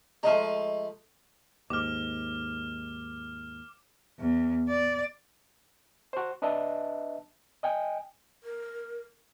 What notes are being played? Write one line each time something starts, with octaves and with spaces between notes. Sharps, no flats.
F3 G#3 A3 D#5 A#5
D#2 G#2 D6 F6
E2
D5
F#4 C5
D4 B4 D#5 E5 A5
D#5 G5 G#5
A#4